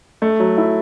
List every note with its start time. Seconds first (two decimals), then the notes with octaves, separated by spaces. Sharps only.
0.22 A3
0.40 F#3
0.58 E4